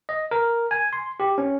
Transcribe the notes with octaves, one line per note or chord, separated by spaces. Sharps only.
D#5
A#4
G#5
C6
G4
C#4